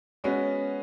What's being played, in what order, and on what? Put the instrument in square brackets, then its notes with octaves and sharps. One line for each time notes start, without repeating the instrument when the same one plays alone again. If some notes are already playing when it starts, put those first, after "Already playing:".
[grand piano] G#3 B3 F#4 [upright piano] C#4